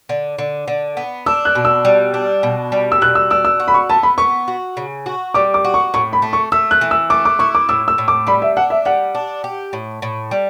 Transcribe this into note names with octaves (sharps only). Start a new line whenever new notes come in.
D3
D3
D3
B3
D4 E6
F#6
B2
E6
G3
D4
B2
G3
E6
B2 F#6
E6
D4 E6
E6
F#4
B5
C#6
B3 A5
B5
B3 C#6
F#4
C#3
F#4
G3 D6
D6
F#4
C#6
A2 C#6
B5
A3
C#6
A3 E6
F#6
E3
E6
A3 D6
D6
E4 C#6
D6
A2 E6
E6
A2
D6
G3 B5
E5
D4 F#5
E5
G3 F#5
D4
G4
A2
A2
G3